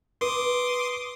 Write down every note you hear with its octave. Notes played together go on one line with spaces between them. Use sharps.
B4 C6 D6 D#6